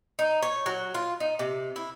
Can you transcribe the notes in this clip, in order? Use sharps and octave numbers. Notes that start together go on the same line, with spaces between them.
D#4
C#5
F#3
F4
D#4
C3
E4